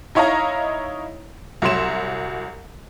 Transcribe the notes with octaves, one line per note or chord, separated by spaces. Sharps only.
D#4 E4 C#5 D#5 F5 A#5
C2 F#3 E5 C6 E7